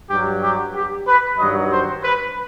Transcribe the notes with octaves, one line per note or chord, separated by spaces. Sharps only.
G2 F#3 G4
G4
G4
B4
G2 D#3 F#3 D#5
C5
B4